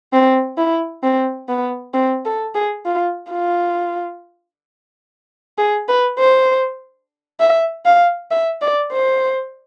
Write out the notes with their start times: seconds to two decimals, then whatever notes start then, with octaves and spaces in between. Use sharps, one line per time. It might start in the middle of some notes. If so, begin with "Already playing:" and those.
0.13 C4
0.57 E4
1.03 C4
1.49 B3
1.94 C4
2.25 A4
2.55 G#4
2.85 F4
3.31 F4
5.58 G#4
5.88 B4
6.19 C5
7.40 E5
7.85 F5
8.30 E5
8.62 D5
8.92 C5